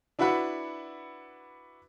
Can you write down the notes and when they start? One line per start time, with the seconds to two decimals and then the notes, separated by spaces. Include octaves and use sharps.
0.19 D4 E4 F#4 B4 F#5 B5